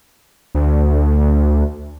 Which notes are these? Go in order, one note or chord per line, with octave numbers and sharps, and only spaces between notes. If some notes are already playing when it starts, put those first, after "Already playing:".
D2